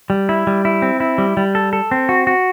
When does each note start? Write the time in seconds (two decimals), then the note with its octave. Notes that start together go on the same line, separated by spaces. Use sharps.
0.10 G3
0.29 E4
0.47 G3
0.65 E4
0.82 C4
1.00 E4
1.18 G3
1.37 G3
1.55 A4
1.73 A4
1.91 C4
2.09 F#4
2.27 F#4